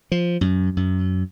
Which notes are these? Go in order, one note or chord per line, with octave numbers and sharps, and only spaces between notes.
F3
F#2
F#2